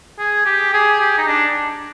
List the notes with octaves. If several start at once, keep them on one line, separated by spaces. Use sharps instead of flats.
G#4
G4
G#4
G4
D#4
D4